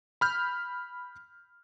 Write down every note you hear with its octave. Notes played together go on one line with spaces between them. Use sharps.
B5 F6 G6